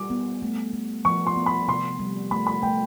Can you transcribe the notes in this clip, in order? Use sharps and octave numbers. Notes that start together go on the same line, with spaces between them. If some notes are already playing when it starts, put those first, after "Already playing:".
Already playing: G3 D6
B3
A3
A3
F3 C#6
C6
B3
B5
C3 C6
G3
A3 B5
B5
A3 G5